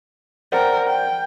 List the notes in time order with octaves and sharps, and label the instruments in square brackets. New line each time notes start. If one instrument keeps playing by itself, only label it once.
[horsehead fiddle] A#4 G5 [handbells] C5 D5 F#5
[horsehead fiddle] G5